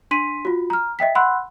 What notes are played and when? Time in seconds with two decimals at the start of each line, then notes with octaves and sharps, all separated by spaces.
0.11 D4 C6 B6 D#7
0.45 F4 F#4
0.70 A#5 F6
0.99 D#5 E5 G5 B6
1.15 F#5 B5 C6 E6 F#6